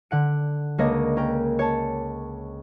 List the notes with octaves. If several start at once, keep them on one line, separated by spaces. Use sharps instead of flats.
D3 F#5 D7
C#2 A#3 D4 C#5 D#5 A#6
C#4 A#4 G5
C#5 A5